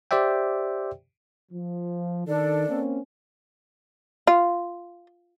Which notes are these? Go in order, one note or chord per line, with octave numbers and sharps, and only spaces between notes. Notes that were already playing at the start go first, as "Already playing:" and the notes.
G4 C5 D5 E5 G5
F3
D#3 D4 A4 D5
A#3 C4 C#4
F4